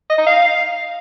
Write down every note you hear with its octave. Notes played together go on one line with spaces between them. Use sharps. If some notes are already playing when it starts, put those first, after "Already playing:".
D#5
D#4
F5